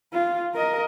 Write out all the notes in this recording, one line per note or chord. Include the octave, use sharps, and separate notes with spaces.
F4
A#4 D#5